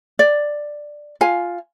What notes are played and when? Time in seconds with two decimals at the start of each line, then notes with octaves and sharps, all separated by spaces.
0.19 D5
1.21 F4 F5 G#5